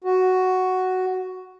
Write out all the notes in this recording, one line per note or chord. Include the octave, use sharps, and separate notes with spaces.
F#4